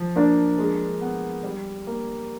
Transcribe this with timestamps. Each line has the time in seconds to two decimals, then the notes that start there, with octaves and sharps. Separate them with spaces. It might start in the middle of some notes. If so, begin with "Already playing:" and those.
Already playing: F3
0.16 A#3 D4
0.58 G#3
1.01 B3
1.43 G3
1.87 A#3